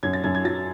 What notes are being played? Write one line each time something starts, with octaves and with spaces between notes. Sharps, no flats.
F#2 G#6
A6
F#2 G#6
G#6
F#3 A6